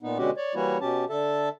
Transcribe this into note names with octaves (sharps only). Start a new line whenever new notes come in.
A#2 B3 D#4
B2 D3 G#3 C#4 F#4 G4
C#5 D5
E3 G3 A#3 E4 F#4 C#5
B2 C#4 G4 A5
D3 A4 E5 A5